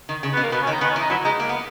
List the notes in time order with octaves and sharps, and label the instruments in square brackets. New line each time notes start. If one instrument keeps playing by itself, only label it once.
[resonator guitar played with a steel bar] D#3
C#3
[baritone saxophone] B3
[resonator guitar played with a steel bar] B2
[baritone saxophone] A#3
[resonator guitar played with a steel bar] B2 [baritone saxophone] B3
[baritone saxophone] C#4
[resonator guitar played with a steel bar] D#3
[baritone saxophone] D#4
[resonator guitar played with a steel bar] D#3 [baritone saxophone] B3
[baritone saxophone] C#4
[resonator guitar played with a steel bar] E3
[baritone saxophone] D#4
[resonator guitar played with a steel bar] F#3 [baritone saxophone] E4
[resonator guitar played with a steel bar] G#3 [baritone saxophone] D#4
[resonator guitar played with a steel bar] A#3
B3